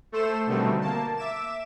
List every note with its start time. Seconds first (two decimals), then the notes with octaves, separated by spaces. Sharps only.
0.12 A3 A4 C5 E7
0.46 B2 D3 D#3 G3 A3 C4
0.81 A#3 A5
1.17 E5 D6 E7